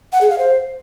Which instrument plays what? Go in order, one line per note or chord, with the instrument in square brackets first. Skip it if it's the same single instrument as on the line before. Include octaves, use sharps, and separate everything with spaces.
[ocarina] F#5
G#4
F5
C5